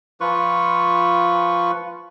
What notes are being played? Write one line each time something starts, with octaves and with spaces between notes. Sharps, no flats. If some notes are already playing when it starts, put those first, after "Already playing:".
F3 F4 B4 C#6